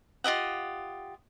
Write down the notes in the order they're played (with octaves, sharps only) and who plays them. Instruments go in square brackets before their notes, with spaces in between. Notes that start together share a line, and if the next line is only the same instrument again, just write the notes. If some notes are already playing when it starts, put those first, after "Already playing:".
[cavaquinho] F4 G4 D#5 F#5